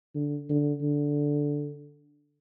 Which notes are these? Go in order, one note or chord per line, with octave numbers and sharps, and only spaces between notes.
D3
D3
D3